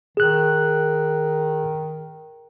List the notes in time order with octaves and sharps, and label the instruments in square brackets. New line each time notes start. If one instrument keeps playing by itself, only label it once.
[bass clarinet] D#3 [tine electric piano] G#4 F#6